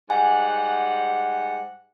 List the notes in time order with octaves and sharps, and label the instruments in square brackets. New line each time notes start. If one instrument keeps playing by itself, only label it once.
[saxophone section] G#2 G3 F#5 [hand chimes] G#5